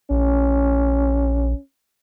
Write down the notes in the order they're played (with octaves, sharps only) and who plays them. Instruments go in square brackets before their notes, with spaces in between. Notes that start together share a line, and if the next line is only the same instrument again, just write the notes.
[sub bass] A#1 [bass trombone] C#4